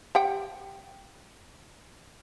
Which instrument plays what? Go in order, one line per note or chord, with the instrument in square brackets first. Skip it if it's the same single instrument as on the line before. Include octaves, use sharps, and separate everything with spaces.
[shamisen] G4 F#5 G5